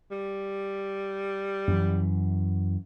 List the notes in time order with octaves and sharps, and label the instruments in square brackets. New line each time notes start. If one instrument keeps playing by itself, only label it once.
[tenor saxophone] G3
[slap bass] F#2 E3